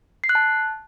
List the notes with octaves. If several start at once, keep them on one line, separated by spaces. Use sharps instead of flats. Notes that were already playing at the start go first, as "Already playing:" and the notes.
C7
F#6
A5